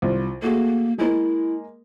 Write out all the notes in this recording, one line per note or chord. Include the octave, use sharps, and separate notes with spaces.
C2 F4
A3 A#3 F#4 G#4
G#3 A#3 E4